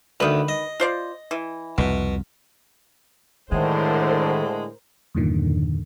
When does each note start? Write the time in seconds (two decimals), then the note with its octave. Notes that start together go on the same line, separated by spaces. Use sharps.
0.20 D2 D#3 B4
0.49 D#5
0.80 F4 C5 D5
1.31 E3
1.78 C2 F2 B2
3.52 A2 D3 D#3 G#3 A#4 C5
5.15 E2 G2 A#2 D3 D#3